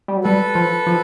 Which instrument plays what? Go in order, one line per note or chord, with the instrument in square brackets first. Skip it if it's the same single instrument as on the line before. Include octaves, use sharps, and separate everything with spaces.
[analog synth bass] G3
F#3
[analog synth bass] G3 [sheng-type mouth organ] A4 B4
[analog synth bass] F3
F3